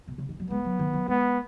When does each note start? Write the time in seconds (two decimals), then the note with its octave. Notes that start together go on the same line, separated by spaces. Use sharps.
0.08 B2
0.18 C#3
0.29 D#3
0.39 F#3
0.50 G#3 B3
0.65 F#3
0.79 D#3
0.93 F#3
1.08 G#3 B3